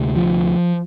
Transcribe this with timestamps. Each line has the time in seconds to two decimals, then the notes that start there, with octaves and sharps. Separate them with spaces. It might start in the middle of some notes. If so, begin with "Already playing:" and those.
Already playing: D2 C3
0.16 F3